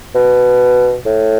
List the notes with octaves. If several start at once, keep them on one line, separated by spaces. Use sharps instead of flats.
B2
A2